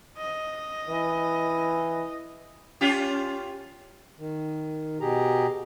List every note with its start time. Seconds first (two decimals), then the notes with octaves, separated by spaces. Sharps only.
0.18 D#5
0.88 E3
2.81 C#4 F4 G4
4.19 D#3
5.00 B2 G4 G#4 A#5